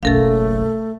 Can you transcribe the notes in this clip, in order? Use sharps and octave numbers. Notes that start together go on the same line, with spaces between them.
F#1 B1 A3 A4 A#4 F5